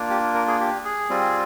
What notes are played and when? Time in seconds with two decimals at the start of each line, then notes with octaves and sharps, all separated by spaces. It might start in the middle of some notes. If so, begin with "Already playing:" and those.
Already playing: A#3 D4 F4
0.10 G4
0.35 A#4
0.47 G#4
0.60 G4
0.85 G#4
1.10 G3 C4 F4